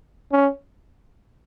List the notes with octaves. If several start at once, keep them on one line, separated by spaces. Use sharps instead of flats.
C#4